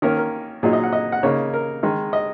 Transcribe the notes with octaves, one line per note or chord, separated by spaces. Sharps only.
D#3 A#3 C#4 A#4
A#4
A#2 F#3 D#4 G#4
D#5
F#5
D#5
F#5
C#3 A#3 D#4 C#5
A#4
D#3 G#3 D#4
D#5